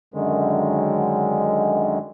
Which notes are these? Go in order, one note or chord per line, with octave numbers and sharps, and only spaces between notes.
F#2 D3 D#3 G#3